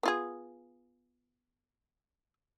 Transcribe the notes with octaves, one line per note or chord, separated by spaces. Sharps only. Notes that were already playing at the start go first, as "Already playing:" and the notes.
B3 F4 G#4